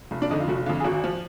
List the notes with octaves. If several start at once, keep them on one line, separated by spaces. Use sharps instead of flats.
F1
D4
F2 D3 D#4
F4
F1 F#4
F2 D3 F4
G#4
G#1 F#4
F3